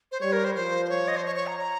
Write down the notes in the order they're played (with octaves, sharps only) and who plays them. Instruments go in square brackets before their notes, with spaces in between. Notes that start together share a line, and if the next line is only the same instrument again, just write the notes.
[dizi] C5
[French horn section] G3 [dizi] C#5
[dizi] A#4
C5
[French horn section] F3 [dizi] C5
[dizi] C5
C#5
D#5
C5
C#5
C#5
A#5
A#5